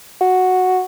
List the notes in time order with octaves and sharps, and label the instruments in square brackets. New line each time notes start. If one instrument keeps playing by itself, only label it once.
[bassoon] F#4